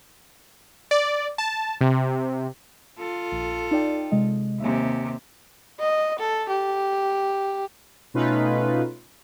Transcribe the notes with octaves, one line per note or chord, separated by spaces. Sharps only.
D5
A5
C3
F4 A4
A#1
D#4 D5 G5
C3 G#3 D#5
D#2 C3 E5 G#5
D#5
A4
G4
B2 A3 C#4 D#4 F4 B4